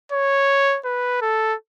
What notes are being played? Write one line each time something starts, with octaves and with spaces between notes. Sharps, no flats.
C#5
B4
A4